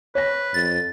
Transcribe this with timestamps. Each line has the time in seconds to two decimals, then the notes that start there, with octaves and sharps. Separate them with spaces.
0.15 B4 C#5 A#6
0.54 F2 A6